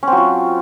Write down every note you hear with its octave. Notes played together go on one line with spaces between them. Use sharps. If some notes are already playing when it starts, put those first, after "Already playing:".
F#3 C4 C#4 F4